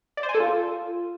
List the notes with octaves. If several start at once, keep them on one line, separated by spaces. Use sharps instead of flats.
D5
C5
G#5
A4
F4